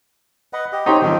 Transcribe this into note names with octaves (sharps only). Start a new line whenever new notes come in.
B4 D#5 F#5
G4 D#5
C4 D#4 G4 C5 C#5 G5
D#3 F3 C4 D#4